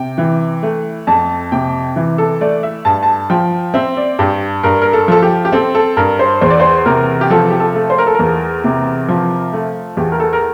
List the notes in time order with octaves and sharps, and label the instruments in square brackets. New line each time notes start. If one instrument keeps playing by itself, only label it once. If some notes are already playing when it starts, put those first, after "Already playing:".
Already playing: [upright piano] C3 G5
E3
A3
F2 A5
C3 G5
E3
A4
A3 D5
E5
G2 A5
A5
F3 G5
C4 E5
D5
G2 G4
G2 A#4
A#4
A4
F3 A4
G4
G4
C4 A4
A4
G2 A#4
C5
E2 C5
D5
C5
C3 A#4
G4
F3 A4
G4
A4
A3
C5
A#4
A4
E2 A#4
C3
F3
A3
E2 G4
A#4
A4
A#4